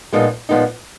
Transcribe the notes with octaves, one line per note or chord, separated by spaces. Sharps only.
A#2 F3 G#3 B3 D#4
A#2 F3 G#3 B3 D#4